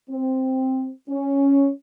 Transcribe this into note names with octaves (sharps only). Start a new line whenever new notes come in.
C4
C#4